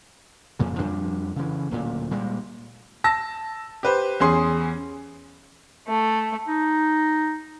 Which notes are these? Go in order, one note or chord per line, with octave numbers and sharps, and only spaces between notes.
F2 A#2 C#3
F2 F3 G3 D4
C#3 E3
D1 A#2
A#2 G3 G#3
A5 E6 A#6
G4 B4 C5
E2 C#4 G#4 C6
A3
D#4